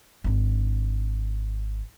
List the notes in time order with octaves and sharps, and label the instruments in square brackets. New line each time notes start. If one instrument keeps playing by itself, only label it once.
[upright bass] G#1 D4